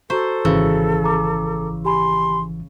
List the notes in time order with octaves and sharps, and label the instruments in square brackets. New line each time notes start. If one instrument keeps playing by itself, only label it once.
[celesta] F#4 A#5 C#6 [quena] A4 [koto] C5
[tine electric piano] G#1 E3 E6 [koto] C#3
[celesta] A#5 D6
[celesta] G4 G#5 B5 [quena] C6